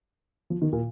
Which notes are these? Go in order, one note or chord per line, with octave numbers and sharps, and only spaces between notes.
F3
D#3
A#2